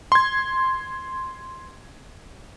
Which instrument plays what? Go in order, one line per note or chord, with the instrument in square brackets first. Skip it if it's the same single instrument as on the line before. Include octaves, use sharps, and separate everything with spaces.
[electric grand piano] C6 G#6